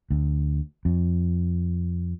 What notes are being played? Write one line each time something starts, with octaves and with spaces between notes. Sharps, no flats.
D2
F2